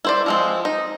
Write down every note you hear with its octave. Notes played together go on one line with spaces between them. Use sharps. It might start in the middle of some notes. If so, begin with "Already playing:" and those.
E4 C5 D5
F3 G#3 C4
D#4